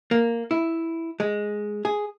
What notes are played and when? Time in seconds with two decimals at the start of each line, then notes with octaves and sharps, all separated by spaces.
0.11 A#3
0.51 E4
1.20 G#3
1.85 G#4